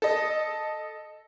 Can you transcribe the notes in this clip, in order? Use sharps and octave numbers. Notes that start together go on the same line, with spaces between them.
A4 D#5